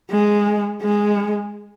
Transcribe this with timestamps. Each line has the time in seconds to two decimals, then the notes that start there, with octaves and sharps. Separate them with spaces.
0.11 G#3
0.82 G#3